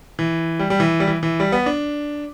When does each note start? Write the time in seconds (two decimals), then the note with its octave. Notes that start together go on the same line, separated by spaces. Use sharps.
0.19 E3
0.59 G3
0.70 G3
0.80 E3
1.00 G3
1.07 E3
1.23 E3
1.40 G3
1.52 B3
1.66 D4